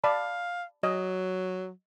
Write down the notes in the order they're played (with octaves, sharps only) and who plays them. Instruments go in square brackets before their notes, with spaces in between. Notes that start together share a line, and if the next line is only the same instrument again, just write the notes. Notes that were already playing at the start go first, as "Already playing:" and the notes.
[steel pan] D5 A5 B5 [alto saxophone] F5
[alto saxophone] F#3 [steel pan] D#5